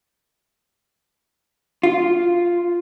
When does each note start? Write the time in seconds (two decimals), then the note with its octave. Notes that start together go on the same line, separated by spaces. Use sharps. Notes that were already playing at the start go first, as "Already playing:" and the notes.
1.83 F4